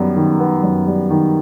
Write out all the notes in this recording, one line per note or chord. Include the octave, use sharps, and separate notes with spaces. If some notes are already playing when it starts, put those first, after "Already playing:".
Already playing: F#2 D#3 G3 B3
D#3
B3
F#2
G3
D#3